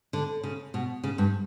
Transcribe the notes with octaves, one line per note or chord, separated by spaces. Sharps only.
D3
C#3
B2
C#3
G2